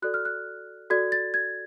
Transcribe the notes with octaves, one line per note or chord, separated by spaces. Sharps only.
F#4 A4 D5 F#6
F6
F#6
F#4 A4 D5 G#6
A6
G#6